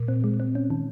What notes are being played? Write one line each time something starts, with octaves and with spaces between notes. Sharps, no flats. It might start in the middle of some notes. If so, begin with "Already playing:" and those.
Already playing: A#2
C4
G#3
C4
C#4
D#3